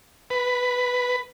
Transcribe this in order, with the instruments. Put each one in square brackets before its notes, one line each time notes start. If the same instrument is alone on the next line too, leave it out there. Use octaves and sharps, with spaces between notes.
[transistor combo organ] B4